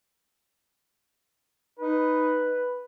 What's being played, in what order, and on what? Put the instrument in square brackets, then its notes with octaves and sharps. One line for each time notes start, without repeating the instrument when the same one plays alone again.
[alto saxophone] D#4 [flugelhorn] B4